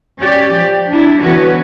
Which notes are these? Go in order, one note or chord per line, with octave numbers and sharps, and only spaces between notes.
C#4 G4 D5
F3
D4 E4
D3 E3 B3 C#4 F#4 B4